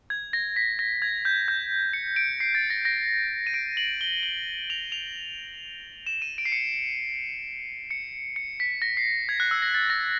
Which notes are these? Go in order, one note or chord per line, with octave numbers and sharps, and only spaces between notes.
G#6
A#6
B6
A#6
G#6
G6
G6
C#7
D7
C7
A6
A#6
A#6
D#7
D7
F#7
G7
F#7
F7
F7
E7
D#7
D7
C7
C#7
C#7
C#7
B6
A#6
C7
G#6
F#6
E6
A#6
A6
A#6